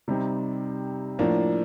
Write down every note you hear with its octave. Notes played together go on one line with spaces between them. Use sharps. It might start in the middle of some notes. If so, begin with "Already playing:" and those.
C3 G3 C4 D#4
A2 F3 A#3 D4